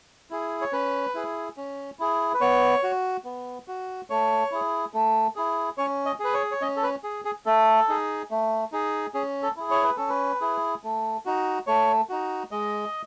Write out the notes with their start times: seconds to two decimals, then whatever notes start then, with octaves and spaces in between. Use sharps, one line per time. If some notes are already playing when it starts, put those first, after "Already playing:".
0.30 E4 G#4
0.61 C#5
0.72 C#4 B4
1.15 E4 G#4
1.57 C#4
1.99 E4 G#4
2.34 B4
2.41 B3 C#5
2.83 F#4
3.25 B3
3.68 F#4
4.10 A3 C#5
4.51 E4 G#4
4.94 A3
5.36 E4 G#4
5.78 C#4 C#5
6.06 D#5
6.20 G#4 B4
6.34 C#5
6.52 C#5
6.61 C#4 D#5
6.76 A4
6.83 B4
7.04 G#4
7.25 G#4
7.46 A3 A4
7.88 D#4 G#4
8.31 A3
8.72 D#4 G#4
9.14 C#4 G#4
9.43 A4
9.57 E4 G#4
9.71 C#5
9.84 B4
9.97 C#4 A4
10.09 B4
10.41 E4 G#4
10.84 A3
11.26 D#4 F#4
11.67 A3 C#5
12.09 D#4 F#4
12.51 G#3 D#5